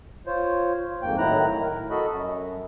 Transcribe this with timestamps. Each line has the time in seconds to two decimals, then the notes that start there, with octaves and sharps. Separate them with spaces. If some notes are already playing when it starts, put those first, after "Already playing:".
0.26 F4 C5 C#5
1.02 F2 G#2 A#3 G5
1.18 A2 D#3 F#3 E4 A#5 F#6
1.63 A#4
1.90 F#4 A4 D#5 B5
2.11 F#2